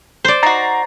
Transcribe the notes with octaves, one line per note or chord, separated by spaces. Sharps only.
C5 D5
D#4 F#4 A#5 A6 C7